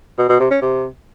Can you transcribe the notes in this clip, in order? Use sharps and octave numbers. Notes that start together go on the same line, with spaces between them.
B2
B2
C3
C#4
C3